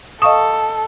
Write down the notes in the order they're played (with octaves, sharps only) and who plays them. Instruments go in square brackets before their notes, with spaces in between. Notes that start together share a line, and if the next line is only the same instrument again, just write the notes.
[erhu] A4 [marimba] D#5 D#6 [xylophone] F5 C#6 E7